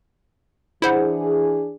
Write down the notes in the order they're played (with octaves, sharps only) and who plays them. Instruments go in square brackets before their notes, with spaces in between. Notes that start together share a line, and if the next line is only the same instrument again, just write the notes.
[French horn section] E3 D4 G#4 [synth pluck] E4 C5 F#5